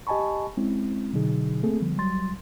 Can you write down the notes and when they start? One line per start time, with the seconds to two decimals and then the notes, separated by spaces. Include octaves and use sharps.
0.07 G4 D#5 G#5 A5 B5 C#6
0.57 G#3 C4 C#4 E4
1.13 B2 D3 F#3 D#4 G#4
1.63 A3 A#3 C4 G#4 A4
1.81 D3 F3 G3 B3
1.98 C2 F#3 G3 C6 A6